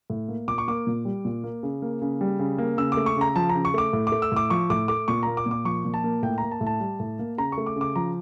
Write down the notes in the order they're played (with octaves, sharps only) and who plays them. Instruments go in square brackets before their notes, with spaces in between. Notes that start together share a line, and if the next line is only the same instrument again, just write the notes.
[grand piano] A2
A#3
A#2 D6
C#6
A#3 D6
A#2
G3
A#2
A#3
C#3
A#3
C#3
G3
C#3
A#3
C#3 E6
A3 D6
C#6
C#3 A#5
F3 A5
A#5
C#3
C#6
A3 D6
A2
D6
A3
E6
A2 D6
F3 C#6
A2 D6
A3 D6
A#2 C#6
A#3 A#5
D6
A#2
D6
F3 C#6
A#2
A5
A#3
A2 G5
A#3 A#5
A5
A2
A5
G3
A2
A#3
C#3 A#5
C#6
A3
D6
C#3
D6
F3 A#5